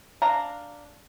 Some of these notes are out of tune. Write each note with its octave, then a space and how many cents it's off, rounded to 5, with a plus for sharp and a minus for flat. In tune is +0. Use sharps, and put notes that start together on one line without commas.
D4 -5 F5 +0 A#5 -15